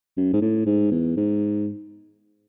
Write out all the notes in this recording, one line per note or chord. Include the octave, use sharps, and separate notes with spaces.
F#2
G#2
A2
G#2
E2
G#2